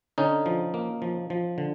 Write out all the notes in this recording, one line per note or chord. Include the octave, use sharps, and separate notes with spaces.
D3 C#4 D#4
F3
A#3
F3
F3
D3